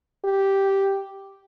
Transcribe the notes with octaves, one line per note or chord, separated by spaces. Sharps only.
G4